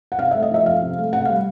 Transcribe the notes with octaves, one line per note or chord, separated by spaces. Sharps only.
F#5
C3 F5
E5
A3
D#5
F3 E5
F2 F5
C3
A3
C3 F#5
F5
G3